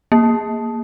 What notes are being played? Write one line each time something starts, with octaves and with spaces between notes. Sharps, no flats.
A#3